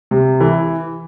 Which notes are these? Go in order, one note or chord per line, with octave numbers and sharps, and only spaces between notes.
C3
E3